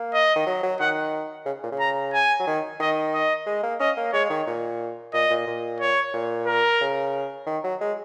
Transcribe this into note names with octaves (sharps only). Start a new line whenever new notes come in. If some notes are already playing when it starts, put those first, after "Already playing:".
Already playing: A#3
D#5
D#3
F#3
F#3
D#3 F#5
C#3
A#2
C#3
A#5
G#5
F#3
D#3
D#3 D#5
D#5
G#3
A#3
C#4 D#5
A#3
G#3 C#5
D#3
A#2
A#2 D#5
A#2
A#2
C#5
A#2
A#4
C#3
D#3
F#3
G#3